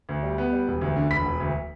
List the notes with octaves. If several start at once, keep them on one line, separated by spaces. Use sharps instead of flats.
D2
G3
B3
G3
E1
D2
D3
E1 B5 B6
E1
D2